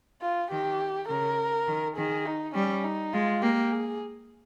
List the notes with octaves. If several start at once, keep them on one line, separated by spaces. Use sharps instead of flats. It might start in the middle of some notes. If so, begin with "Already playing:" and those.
F4
D#3 G4
C#3 A#4
D#3
D#3 G#4
D#4
G3 C#4
D#4
G#3 F4
A#3 G4
G#4